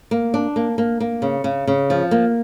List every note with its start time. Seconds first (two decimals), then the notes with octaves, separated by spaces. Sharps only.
0.11 A#3
0.34 D4
0.56 A#3
0.78 A#3
1.00 A#3
1.22 C#3
1.44 C#3
1.67 C#3
1.90 F3
2.11 A#3